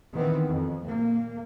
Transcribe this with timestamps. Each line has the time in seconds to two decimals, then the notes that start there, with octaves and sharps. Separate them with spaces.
0.13 D#3 E3 B3 C4
0.46 F2
0.84 A#2 A#3